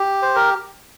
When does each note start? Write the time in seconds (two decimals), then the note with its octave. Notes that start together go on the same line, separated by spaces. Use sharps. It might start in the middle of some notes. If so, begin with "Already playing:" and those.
Already playing: G4
0.22 C5
0.36 A#4